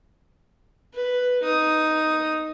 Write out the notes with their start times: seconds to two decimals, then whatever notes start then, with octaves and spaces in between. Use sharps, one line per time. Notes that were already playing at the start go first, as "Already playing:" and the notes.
0.93 B4
1.42 D#4 D#6